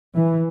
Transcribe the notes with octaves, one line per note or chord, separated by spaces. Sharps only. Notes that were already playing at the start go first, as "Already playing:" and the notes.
E3